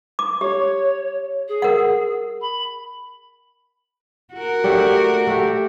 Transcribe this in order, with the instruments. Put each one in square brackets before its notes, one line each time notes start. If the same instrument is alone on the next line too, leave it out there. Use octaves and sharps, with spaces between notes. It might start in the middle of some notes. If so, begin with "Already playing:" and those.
[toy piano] D6
[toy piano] G4 [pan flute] C#5
[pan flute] G#4
[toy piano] A#4 F#5
[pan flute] B5
[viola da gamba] F#4 A#4
[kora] A3 D4 G4
A3 G4